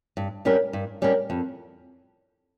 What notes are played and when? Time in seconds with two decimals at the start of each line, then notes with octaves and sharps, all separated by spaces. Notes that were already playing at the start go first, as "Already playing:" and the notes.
0.17 G2
0.45 G3 C#4 G4 A#4
0.73 G2
1.02 G3 C#4 G4 A#4
1.30 F2